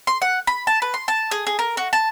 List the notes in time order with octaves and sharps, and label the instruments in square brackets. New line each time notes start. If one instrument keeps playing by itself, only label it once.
[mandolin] C6
F#5
B5
A5
B4
C6
A5
G#4
G#4
A#4
F#4
A5